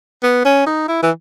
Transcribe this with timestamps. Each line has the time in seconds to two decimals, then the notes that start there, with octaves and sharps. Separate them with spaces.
0.23 B3
0.45 C#4
0.66 D#4
0.88 E4
1.02 E3